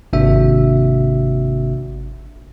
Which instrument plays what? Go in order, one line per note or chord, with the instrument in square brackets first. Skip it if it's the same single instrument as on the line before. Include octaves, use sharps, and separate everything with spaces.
[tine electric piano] G#1 C3 A#3 D4 F#4 E5